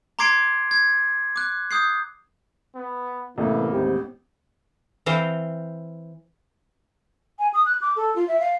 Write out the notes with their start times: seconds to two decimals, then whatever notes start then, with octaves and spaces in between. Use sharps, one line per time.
0.19 A#5 C6 D6 G#6 C7 D7
0.71 G#6
1.36 D6 F#6
1.71 D#6 G6 C7
2.75 B3
3.38 A1 C3 E3 A#3 B3 A4
3.71 D#2 G#2 C3 G4
5.06 E3 C4 C5 F5
7.39 G#5
7.54 D#6
7.66 F#6
7.82 D6
7.96 A4
8.16 F4
8.28 E5
8.40 F5